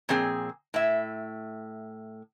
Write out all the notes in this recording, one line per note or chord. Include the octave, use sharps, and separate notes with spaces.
A#2 F3 C4 G#4
A2 E5